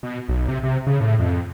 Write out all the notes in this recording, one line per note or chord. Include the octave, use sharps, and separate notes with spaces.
B2
B1
C3
C3
C#3
A2
F2